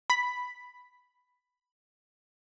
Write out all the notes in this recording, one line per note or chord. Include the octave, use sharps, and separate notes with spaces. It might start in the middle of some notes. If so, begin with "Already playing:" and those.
B5 B6